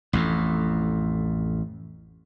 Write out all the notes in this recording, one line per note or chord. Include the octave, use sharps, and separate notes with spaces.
A1 F2 A2